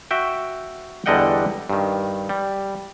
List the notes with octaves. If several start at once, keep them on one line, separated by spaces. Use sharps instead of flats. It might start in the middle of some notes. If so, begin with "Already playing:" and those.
F#4 E5 G5
E2 D3 G3 D#5 F#5 G5
G2 D#3
G3